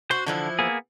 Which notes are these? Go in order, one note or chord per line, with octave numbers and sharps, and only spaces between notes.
F#4 C5
D3 E3 F3 E4
A#3 B3 G#4